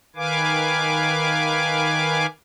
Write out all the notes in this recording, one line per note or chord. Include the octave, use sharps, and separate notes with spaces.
D#3 B4 F5 G#5 D6